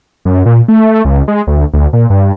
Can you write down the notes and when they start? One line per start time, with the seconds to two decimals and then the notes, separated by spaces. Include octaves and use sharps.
0.25 F#2
0.46 A#2
0.68 A3
1.05 C#2
1.28 G#3
1.47 D2
1.73 D2
1.93 A#2
2.10 G2